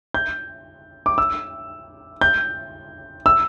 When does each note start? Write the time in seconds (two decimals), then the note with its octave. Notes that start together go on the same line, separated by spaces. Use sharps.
0.14 G6
1.06 D6
1.18 E6
2.21 G6
3.26 E6